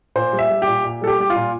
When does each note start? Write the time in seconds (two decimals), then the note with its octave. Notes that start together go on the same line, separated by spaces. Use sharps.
0.16 A#2 C5
0.33 G3
0.39 E5
0.50 G3
0.62 G4
0.67 A#2
0.85 A#2
1.02 G3 A4
1.07 G4
1.19 G3 G4
1.30 F4
1.36 A#2